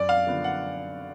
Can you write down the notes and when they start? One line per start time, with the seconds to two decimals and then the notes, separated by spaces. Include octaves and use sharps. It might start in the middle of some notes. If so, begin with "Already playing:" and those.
Already playing: F#2 D5
0.09 F5
0.27 D3 F3 B3 D4
0.44 F#5